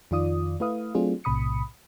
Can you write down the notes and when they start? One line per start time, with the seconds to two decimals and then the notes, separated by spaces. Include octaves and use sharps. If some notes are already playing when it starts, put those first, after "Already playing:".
0.11 F2 D#3 F4 D5 D#6
0.60 A3 E4 B4 F5 D#6
0.95 F#3 A3 C4 D4 F4 G#4
1.24 B1 A2 C3 B5 D#6 C#7